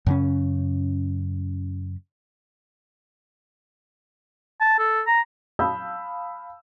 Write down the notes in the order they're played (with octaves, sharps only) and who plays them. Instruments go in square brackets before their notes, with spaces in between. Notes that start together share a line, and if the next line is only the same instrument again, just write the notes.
[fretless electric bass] F#2 C#3 C#4
[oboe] A5
A4
A#5
[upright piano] F5 A5 B5 D#6 E6 G6